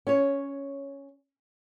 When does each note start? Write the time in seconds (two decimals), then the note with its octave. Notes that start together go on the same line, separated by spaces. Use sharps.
0.07 C#4 C#5